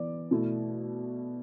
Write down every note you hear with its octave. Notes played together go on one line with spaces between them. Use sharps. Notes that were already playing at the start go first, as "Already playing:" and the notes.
Already playing: E3 B3 D5 D6
B2 A3 E4